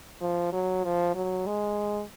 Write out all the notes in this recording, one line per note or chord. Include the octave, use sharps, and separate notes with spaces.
F3
F#3
F3
F#3
G#3